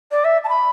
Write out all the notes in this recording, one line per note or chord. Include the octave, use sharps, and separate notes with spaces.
D5
E5
A5
B5